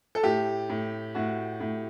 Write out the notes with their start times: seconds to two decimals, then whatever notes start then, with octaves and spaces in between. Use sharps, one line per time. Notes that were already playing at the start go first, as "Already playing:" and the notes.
0.15 A4
0.23 A2 G4
0.69 A2
1.15 A2 F#4
1.60 A2